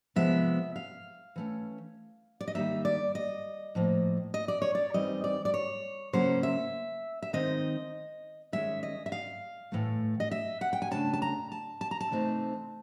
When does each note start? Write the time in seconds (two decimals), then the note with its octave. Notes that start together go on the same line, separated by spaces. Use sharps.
0.16 C3 F3 G#3 B3 E5
0.76 F5
1.36 E3 A3 C#4
2.41 D5
2.48 D#5
2.55 D#3 G3 A#3 D#4 E5
2.85 D5
3.15 D#5
3.75 A2 F3 A#3
4.34 D#5
4.48 D5
4.62 C#5
4.75 D5
4.94 E3 G3 C4 D#4 D#5
5.24 D5
5.45 D5
5.54 C#5
6.13 C#3 F#3 A#3 C#4 C5
6.43 E5
7.22 E5
7.33 D#3 G#3 C4 D#4 D#5
8.53 D#3 G#3 C#4 E5
8.83 D#5
9.06 E5
9.12 F5
9.72 A2 E3 A3
10.20 D#5
10.31 E5
10.61 F#5
10.73 G5
10.82 G#5
10.91 C#3 F3 A3 D4 A5
11.14 A5
11.22 A#5
11.52 A5
11.81 A5
11.91 A#5
12.01 A5
12.11 C3 E3 A3 C4 D#4